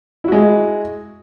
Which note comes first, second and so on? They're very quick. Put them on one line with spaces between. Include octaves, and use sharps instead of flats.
E4 F#4 G#3